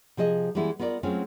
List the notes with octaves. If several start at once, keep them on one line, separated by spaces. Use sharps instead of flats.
C3 F3 G#4 D#5
E3 G3 G#3 B3 E4
B3 F4 A#4 C5 D5
F#3 G#3 A3 C4 C#4 F4